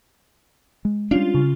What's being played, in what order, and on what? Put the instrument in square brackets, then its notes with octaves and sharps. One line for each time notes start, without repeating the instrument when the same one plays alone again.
[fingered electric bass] G#3
[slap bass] G3 C#4 D4 [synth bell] F4
[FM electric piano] C#3